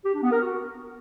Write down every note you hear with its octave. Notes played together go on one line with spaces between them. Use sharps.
G4
D4
B3
A#4
F#4